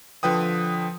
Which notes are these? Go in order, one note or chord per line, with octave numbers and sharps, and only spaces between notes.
D3 F3 B4 G5 D#6